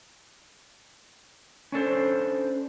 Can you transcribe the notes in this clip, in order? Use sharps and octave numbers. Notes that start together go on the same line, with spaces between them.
C#4 D4 A4 C5